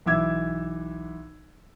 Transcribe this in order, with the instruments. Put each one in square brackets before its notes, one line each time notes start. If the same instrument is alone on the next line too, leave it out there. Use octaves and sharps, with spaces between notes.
[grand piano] B1 E3 E5 D6 E6 G#6